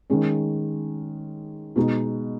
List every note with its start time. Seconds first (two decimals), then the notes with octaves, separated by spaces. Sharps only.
0.10 D#3 G#3 C#4
1.76 B2 G#3 D#4 F#4